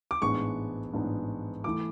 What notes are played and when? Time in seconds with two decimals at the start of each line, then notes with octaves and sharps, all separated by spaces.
0.11 D6
0.22 A1 G#2 G#3 B3 D4 C#6
0.94 A1 G#2 G#3 B3 D4
1.64 E3 A3 E4 D6